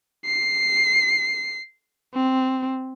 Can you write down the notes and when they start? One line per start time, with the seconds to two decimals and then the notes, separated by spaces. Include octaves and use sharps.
0.25 C7
2.14 C4